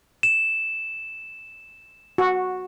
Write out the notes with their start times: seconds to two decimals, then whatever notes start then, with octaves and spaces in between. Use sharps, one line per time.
0.23 E7
2.18 F#4